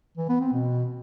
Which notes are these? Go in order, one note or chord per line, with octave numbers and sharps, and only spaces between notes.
E3
B3
C4
B2